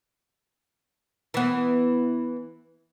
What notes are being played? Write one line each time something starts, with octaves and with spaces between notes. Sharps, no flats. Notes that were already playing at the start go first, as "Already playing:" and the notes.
E3 B3